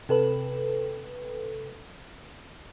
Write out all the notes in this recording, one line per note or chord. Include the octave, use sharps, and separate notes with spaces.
C3 A4 B4